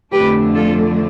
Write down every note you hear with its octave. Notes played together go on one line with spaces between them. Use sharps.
F2 D3 A3 D4 G4 B4
F4 A4